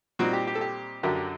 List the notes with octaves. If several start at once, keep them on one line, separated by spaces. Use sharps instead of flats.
A#2 G3 C4 D#4 F#4
G4
G4
A4
G4
F#2 D3 F#3 G4 A#4
G4